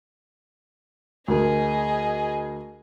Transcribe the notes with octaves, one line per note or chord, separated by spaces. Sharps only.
D2 G#4 A#4 D#5